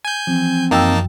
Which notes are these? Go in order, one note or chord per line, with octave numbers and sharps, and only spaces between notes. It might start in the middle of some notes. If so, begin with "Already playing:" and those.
G#5 G6
E3 F3 C4
F#2 A#3 D#4 G5 A5 E6